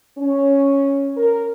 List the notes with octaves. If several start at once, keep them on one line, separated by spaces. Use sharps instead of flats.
C#4
A#4